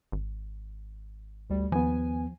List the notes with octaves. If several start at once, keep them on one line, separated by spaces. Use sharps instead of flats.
G#1
D2 G3
D#2 F3 B3 G#5